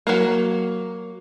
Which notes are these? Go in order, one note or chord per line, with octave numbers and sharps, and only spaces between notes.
F#3 A#3